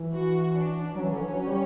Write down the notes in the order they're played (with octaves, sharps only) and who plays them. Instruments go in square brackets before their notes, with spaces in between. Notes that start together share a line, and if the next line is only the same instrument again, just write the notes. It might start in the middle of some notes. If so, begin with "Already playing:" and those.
Already playing: [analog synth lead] E3
[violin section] F#4
D4
[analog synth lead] F#3 [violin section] C#4
[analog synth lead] E3
D3
E3
F#3
G3